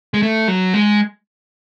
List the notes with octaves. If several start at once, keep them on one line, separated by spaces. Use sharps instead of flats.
G#3
A3
F#3
G#3